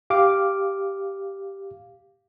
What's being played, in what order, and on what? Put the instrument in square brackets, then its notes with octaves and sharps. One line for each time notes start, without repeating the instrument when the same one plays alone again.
[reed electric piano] G4 F5 D6